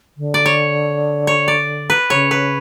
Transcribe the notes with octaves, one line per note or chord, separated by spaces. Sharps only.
D3
D5
C#5
C#5
D5
B4
C#3 C#5
B4